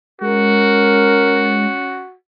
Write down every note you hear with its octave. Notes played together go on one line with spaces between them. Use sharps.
G#3 C#4 F#4 A#4